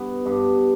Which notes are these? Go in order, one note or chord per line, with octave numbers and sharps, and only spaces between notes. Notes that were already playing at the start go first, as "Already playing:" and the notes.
Already playing: G2 B3
G2